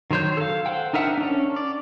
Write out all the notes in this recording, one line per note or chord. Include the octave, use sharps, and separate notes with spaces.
D#3 F#3 C5 C#5 G6
A4 F5
C5 F#5 G5
D4 D#4 A#4 E5 F#5
C#4 D4
D5